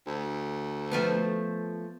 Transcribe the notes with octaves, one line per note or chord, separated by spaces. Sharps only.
D2
F3 A3 B3